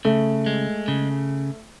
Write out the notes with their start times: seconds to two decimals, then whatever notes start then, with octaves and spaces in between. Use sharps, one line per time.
0.05 C#3 A3
0.46 G#3
0.88 C#3